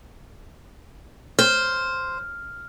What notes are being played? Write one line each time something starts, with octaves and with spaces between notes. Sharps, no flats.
C5 F6